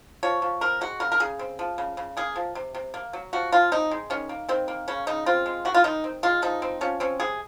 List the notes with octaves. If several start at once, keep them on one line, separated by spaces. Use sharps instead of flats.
F3 C#5
F3
C4 A#4
G#3 F#4
C#3 A#4
A#4
C#3 G#4
C4
F3
C#3
C#3
A#3 G#4
F3
C3
C3
A#3
F#3
F3 F#4
F3 F4
C4 D#4
G#3
D#3 C#4
A#3
D#3 C4
A#3
C#3 C#4
C#3 D#4
C4 F4
G#3
D#3 F#4
F4
D#3 D#4
C4
G#3 F4
F3 D#4
C4
F3 C#4
C4 C#4
C3 G#4